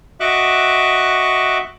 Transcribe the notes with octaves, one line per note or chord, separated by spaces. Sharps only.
F#4 D#5 E5 C#6 D6 F#6